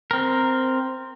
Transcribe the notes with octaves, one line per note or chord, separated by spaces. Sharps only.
C4 A#4